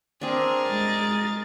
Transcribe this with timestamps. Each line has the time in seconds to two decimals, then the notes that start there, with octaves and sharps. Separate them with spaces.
0.21 C4 D4 G#4 A#4
0.68 G#3 A6